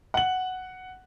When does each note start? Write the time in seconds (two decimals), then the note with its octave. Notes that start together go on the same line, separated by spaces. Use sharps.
0.14 F#5 F#7